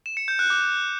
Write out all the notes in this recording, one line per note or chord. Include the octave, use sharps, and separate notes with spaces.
E7
C#7
G6
F#6
D6